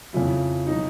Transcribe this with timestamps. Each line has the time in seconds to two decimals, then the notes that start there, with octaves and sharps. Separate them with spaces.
0.13 F2 C#3 F3 E4
0.67 B2 F#3 D#4